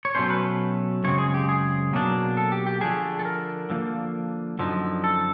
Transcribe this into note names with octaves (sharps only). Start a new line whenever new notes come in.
C#5
B2 F#3 A3 C#4 C5
B4
F#2 C#3 G#3 C4 C#5
G#4
G4
G#4
B2 F#3 A#3 D4
A4
G4
G4
D3 F3 A3 D4 G#4
A4
A#4
D3 F3 A#3
F#2 D3 F3 D#4
A4